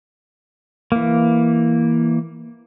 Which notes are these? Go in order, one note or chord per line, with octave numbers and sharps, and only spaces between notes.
E3 A#3